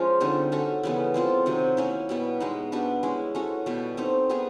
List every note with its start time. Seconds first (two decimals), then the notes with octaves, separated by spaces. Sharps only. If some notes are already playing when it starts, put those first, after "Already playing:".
Already playing: F3 G#3 C#4 F4
0.20 D3 G3 C4 D#4
0.52 A3 C#4 F#4 A4
0.83 C#3 E3 G3 B3
1.14 G#3 C4 F4 A4
1.46 C3 D#3 F#3
1.77 A#3 C#4 E4
2.09 B2 G3 B3
2.40 G#3 B3 D#4
2.72 G3 B3 D4 F#4
3.03 G#3 C#4 E4
3.35 A3 C#4 F#4
3.66 B2 G3 B3
3.97 A3 C4 D#4
4.29 G3 B3 D#4 G#4